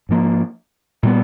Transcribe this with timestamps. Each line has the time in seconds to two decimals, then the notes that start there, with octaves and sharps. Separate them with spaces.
0.09 G#2 F3 A#3
1.03 A#2 G3 B3